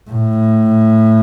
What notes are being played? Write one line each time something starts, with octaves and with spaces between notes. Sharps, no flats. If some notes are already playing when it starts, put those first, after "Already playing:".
A2